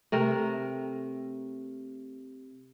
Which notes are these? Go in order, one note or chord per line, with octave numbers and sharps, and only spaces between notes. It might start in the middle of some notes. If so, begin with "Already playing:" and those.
C3 A3 A#4